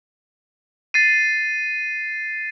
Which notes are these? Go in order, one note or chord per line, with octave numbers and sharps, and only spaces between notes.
A6 C7 D#7